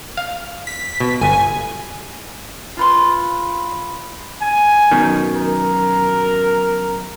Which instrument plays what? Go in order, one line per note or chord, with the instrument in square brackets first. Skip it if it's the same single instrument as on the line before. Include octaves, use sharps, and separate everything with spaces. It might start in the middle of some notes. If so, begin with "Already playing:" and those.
[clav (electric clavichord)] F5
[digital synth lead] B6
[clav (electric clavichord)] B2
[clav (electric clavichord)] G1 [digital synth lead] G#5
[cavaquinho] F4 B4 C6
[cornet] G#5
[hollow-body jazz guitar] F#2 B2 D#3
[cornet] A#4